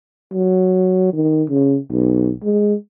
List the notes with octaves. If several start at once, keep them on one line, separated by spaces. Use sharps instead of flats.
F#3
D#3
C#3
B1
G#3